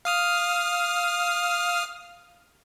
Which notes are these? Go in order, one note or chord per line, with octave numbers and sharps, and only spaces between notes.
F5 D#6 F6